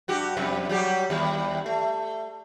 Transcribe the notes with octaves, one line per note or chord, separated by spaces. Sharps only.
G2 F#4 G4
F2 C3 G3
F#3 G3 G4
D#2 G3
A3